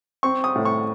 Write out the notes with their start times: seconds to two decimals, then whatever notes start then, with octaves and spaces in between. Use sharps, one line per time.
0.23 C4 C#6
0.44 D#6
0.55 A2
0.65 C#6